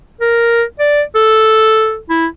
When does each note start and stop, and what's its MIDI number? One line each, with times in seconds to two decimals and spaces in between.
0.21 0.63 70
0.80 1.02 74
1.15 1.98 69
2.10 2.26 64